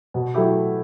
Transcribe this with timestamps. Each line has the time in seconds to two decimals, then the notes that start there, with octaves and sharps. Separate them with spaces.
0.14 B2
0.34 F#3 A3 E4 G4